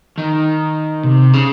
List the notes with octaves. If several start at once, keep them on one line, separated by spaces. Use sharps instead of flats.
D#3
C3
C#3